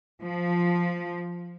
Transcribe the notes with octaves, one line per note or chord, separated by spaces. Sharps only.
F3